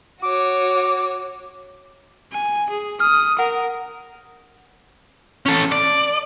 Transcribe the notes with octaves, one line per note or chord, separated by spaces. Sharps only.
F#4 C#5 D6
G#5
G#4
D#6 F6
A#4 F#5
C#4 A4
D5